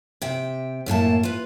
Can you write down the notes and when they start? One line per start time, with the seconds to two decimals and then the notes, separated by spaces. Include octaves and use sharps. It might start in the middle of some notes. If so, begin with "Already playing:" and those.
0.22 C3 G5
0.86 F#2 A2 A#3 A5
1.23 F4 B4